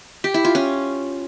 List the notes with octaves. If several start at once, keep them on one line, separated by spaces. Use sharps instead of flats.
G4
E4
F4
C#4